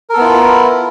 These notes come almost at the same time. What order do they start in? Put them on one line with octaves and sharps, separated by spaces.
A#4 A4 B3 E4 F4